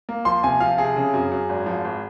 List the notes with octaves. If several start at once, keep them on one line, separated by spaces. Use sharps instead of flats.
A#3
F3 C6
C3 G#5
F3 F5
C3 G#4
C#3
F#2
F#2
G#1
F3
G#1